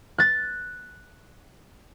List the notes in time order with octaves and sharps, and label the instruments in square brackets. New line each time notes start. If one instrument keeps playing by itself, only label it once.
[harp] F#6 A6